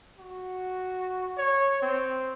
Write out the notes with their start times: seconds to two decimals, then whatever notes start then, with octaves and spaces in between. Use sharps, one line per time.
0.19 F#4
1.38 C#5
1.83 C4